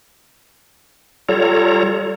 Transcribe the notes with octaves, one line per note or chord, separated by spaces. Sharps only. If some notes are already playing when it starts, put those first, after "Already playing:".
G3 F4 A4 C#5 A#5